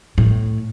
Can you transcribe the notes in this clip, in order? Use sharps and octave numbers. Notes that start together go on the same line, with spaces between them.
A2